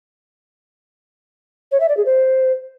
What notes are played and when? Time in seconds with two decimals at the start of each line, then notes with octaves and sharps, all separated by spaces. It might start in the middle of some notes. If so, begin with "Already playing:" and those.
1.72 C#5
1.80 E5
1.89 D5
1.97 G#4
2.06 C5